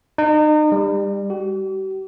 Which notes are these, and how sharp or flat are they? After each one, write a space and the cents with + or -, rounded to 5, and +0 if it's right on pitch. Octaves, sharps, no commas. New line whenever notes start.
D#4 -35
G3 +25
G4 -45